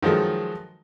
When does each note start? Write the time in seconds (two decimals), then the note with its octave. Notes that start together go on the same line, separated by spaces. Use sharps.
0.03 D#3 F3 F#3 G#3 A4